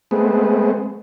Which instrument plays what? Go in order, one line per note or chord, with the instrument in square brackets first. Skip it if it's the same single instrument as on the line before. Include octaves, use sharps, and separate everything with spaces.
[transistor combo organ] G#3 A3 B3 C4